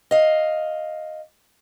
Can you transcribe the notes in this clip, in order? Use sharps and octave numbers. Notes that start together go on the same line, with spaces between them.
D#5 F5